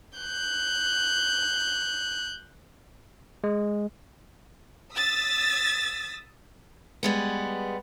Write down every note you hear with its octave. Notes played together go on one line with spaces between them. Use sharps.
F#6 G6
G#3
D#6 E6 A6 B6
G3 G#3 B3